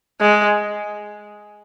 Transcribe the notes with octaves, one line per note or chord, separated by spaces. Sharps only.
G#3